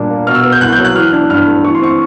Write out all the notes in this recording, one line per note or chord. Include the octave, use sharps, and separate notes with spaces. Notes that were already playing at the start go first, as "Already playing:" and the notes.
Already playing: A#2 G3 D4
A#3
B2 F6
E6
B3 F6
G6
C2 F#6
G6
F#3
F#6
E3 F6
D4 F#6
G2 F6
A3
E3 C#6
C6
C4 C#6